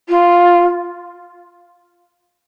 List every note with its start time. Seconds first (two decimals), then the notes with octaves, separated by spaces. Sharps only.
0.09 F4